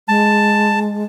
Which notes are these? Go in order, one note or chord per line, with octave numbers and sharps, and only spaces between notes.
G#3 A5